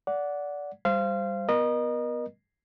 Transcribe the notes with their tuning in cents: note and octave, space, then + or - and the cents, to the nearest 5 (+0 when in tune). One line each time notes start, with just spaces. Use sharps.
D5 -20 F#5 -5
G3 +15 C5 +0 F5 -25
B3 +0 A#4 +35 D#5 -25